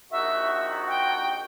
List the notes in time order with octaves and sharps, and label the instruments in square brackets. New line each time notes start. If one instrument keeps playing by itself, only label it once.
[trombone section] A#1 D#3 F#4 [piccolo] E5
[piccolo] G5